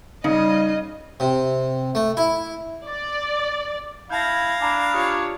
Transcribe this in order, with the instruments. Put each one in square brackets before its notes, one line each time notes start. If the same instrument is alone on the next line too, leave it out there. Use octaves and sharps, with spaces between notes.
[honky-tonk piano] C#3 [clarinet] G3 [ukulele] D#4 [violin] D#5
[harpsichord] C3
A3
E4
[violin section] D5
[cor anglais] E4 [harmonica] F5 [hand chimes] A5 G6 [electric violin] G#6 A#6
[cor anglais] D4 [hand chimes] G#5 A#5 B5
[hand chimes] F4 G4 D#6 [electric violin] C#5